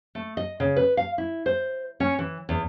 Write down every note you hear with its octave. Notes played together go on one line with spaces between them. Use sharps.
A3
D#5
C#3
B4
F5
E4
C5
C#4
E3
E2